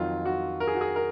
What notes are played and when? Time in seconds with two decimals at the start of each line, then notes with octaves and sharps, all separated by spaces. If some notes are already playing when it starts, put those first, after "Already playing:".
Already playing: F2 D#3 F#3 F4
0.25 F#4
0.60 A#4
0.67 G#4
0.75 F#4
0.81 G#4
0.96 A#4